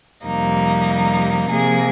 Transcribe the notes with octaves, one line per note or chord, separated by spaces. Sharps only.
F2 C3 G3 A#3 D#4
C3 F3 A#3 G#4